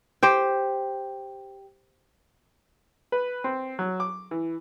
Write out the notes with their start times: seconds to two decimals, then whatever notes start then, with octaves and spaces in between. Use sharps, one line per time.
0.23 G4 C5 G5
3.12 B4
3.44 C4
3.79 F#3
4.00 D6
4.31 E3